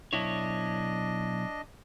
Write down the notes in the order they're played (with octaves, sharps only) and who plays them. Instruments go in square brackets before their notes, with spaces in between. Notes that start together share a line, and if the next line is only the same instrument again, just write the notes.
[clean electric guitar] B1 E4 C#5 [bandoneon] D4 D#5